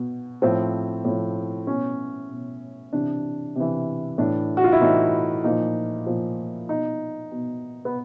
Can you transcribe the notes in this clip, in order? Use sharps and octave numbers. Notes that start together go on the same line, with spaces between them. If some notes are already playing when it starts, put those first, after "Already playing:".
Already playing: B2
A2 F3 C4
A2 F3
B2 C#4
B2
C3 E3 D4
C3 E3
A2 E3 D4
F#4
F4
E4
A2 E3 D#4
A#2 F3 D#4
A#2 F3
B2 D#4
B2
B3